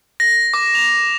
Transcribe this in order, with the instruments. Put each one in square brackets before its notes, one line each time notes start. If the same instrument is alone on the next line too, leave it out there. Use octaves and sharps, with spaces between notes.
[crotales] A#6
D6
F7